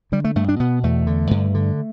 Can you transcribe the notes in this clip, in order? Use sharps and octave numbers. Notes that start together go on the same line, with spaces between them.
D3 G3
A3
G2 A3
D4
B2 B3
E2 A3
D3
G2
D3